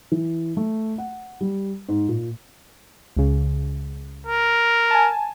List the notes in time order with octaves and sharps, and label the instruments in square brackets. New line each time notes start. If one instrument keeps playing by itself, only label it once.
[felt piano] E3
A3
F#5
G3
G#2
A#2
[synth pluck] C#2 C#3
[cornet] A#4
[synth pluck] G#5 A5